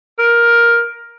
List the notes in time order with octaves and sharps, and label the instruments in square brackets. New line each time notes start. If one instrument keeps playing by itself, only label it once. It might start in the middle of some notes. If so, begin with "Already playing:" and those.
[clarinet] A#4